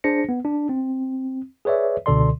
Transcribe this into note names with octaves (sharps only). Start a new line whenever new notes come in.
D4 G#4 C5 A#6 C#7
B3
D4
C4
G#4 B4 C#5 D5 E5
C#2 B2 D3 A4 D5 C6